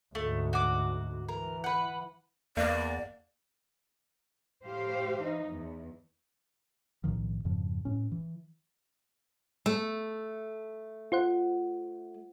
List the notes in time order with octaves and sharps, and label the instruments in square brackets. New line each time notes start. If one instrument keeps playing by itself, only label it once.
[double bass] D2 G#2 [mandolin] A3
[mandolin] F#4 D6
[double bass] E3 [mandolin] A#4
[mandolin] B4 F#5
[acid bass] E2 [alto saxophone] A#3 [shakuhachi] D5
[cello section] A2 G4 C5 F5
E3 D#4
E2
[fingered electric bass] B1 A2 D#3 F3
F2 G#2 C#3 F3
A2 C#4
E3
[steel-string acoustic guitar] A3 [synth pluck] E6
[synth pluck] F4 C5 F#5